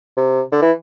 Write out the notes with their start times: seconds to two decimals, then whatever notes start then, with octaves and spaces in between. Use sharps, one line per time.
0.17 C3
0.52 D3
0.62 E3